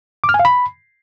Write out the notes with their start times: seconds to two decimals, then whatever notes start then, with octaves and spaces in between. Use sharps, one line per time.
0.24 D6
0.29 F6
0.34 G#5
0.40 F5
0.45 B5